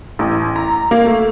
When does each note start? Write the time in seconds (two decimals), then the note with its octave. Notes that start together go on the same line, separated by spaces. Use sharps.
0.19 A1
0.56 A#5
0.91 A#3
1.06 A3